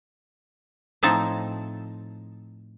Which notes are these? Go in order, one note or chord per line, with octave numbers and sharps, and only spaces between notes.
A2 F3 C4 D#4 A5